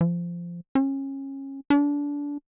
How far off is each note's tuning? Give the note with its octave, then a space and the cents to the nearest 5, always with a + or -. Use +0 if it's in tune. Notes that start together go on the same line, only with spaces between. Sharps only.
F3 -15
C#4 -25
D4 -25